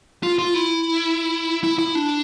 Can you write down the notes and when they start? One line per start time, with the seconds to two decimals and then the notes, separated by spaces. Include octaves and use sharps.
0.23 F4
0.39 F4
0.54 E4
1.64 E4
1.79 E4
1.95 D4